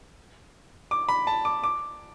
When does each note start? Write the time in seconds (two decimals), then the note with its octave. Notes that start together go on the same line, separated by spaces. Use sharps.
0.91 D6
1.09 B5
1.27 A5
1.45 D6
1.64 D6